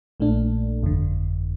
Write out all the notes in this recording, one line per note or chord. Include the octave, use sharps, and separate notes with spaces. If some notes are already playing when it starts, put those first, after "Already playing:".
A#1 A#2 A3 D4
G1 F2 D3